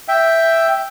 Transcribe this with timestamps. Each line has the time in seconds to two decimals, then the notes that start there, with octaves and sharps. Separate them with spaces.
0.08 E5 G5